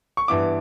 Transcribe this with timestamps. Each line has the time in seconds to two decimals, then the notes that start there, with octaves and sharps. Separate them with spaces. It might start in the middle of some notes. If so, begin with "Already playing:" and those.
0.17 C#6
0.28 G2 E3 B3 E4 D6